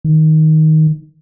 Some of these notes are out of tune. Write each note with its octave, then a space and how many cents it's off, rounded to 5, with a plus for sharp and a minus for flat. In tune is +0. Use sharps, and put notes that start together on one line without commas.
D#3 +10